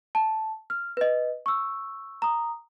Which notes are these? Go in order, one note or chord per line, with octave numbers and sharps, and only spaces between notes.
A5
F6
B4 D#5
C#6 E6
A#5 D#6